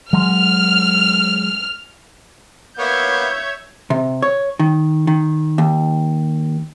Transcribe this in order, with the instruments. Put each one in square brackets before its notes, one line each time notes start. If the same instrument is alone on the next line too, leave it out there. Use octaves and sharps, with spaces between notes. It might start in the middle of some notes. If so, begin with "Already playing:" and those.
[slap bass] F#3 G#3 [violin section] F6
[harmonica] A#3 B3 [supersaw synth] C#5 E5 [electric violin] G6 G#6
[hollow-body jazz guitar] C3
C#5
D#3
D#3
D#2